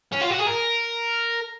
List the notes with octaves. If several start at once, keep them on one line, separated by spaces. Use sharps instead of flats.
C#4
F4
F#4
G#4
A#4